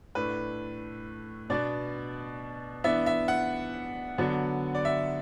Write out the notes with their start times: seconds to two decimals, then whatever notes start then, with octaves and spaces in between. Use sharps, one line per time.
0.15 A2 A3 D4 B4
1.50 B2 B3 D4 D5
2.84 E3 B3 D4 E5
3.06 E5
3.28 F#5
4.18 D3 F#3 B3 D4
4.75 D5
4.85 E5